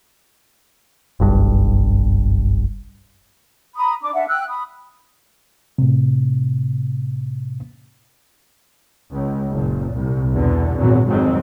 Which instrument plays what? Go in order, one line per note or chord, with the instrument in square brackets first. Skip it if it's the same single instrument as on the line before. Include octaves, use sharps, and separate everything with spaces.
[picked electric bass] F#1 B1 G2
[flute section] A#5 B5 D#6
D4 D6
D4 E5 F#5
G5 E6 F#6
B5 D#6
[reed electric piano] A2 C3
[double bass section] C#2
F#1 A#2
C2
E2 B2 D3
G#1 E2 A#2 F#3
G#1 F2 G#2 F#3 G#3 C4